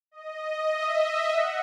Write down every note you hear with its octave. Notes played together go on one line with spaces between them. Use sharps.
D#5
E5
F#5